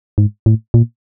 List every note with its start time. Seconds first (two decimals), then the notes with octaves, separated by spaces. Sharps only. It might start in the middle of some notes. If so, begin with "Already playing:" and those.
0.18 G#2
0.46 A2
0.74 A#2